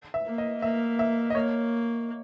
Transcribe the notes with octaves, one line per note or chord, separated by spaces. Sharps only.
E5
A#3
D#5
A#3 E5
E5
D#5
A#3 C#5